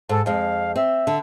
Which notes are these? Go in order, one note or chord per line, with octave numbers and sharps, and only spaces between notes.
G#2 A4
F2 G#3 F5
C4 E5
D3